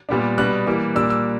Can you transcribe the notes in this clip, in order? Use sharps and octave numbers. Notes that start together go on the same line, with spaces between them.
A#2 G3 B3 D4
B2 G3 B3 D4 F#6
E3 G3 A#3
A#2 G3 A#3 D4 E6
E6